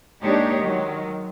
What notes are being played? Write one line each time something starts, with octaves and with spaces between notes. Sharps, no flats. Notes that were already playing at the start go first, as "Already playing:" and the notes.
G#3 A#3 D4 D#4 G4 C#5
D#3 F#3 G#3